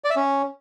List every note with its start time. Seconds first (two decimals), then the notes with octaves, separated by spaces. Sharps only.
0.04 D5
0.10 E5
0.16 C#4